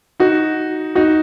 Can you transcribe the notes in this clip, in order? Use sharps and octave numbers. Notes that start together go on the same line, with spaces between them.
D#4 F#4
D#4 F#4